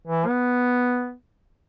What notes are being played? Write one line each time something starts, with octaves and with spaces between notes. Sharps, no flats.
E3
B3